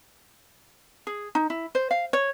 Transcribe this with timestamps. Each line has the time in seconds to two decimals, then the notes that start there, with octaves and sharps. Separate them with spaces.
1.07 G#4
1.35 D#4
1.50 E4
1.75 C5
1.91 F5
2.13 C#5